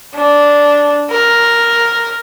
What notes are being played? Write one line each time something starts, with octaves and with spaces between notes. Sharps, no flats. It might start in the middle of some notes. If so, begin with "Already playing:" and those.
D4
A#4